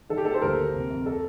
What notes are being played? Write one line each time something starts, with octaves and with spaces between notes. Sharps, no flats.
D#3 A4
G4
A#3 A4
C5
D2 A#4
A#3
C3
F2
A4